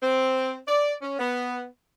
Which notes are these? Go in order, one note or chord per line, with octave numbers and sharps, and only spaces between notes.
C4
D5
C#4
B3